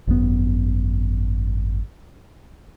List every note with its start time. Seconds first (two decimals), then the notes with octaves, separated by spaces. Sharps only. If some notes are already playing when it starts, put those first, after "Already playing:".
0.07 G#1 F#2 D3 B3